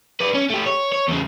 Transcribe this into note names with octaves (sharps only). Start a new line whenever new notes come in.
B4 D5
C#4
A3 G4
C#5
C#5
E2 C#3